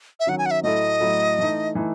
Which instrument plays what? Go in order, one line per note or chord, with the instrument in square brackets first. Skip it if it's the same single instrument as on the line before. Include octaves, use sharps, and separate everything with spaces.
[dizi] E5
[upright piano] D#3 F#3 C#4 [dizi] F#5
[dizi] G#5
F#5
E5
[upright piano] A2 F#3 A3 E4 A4 [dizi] D#5
[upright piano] A2 F#3 A3 E4 A4
E3 A3 D#4
E3 A3 D#4